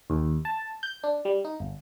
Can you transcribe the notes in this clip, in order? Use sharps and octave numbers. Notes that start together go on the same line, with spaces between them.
D#2
A5
G6
D4
G3
D#4
G1